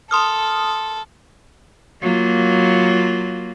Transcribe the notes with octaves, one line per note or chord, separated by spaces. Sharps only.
A4 C6 D#6 F6
F#3 A#3 F4